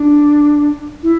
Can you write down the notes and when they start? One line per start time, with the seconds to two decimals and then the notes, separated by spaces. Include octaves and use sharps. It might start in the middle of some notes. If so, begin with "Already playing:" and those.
Already playing: D4
1.03 E4